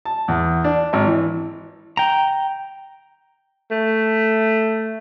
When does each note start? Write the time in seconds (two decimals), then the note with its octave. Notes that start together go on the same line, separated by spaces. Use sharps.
0.05 A5
0.28 E2
0.64 D4
0.93 G#1
1.06 E3
1.97 G5 A#5
3.71 A3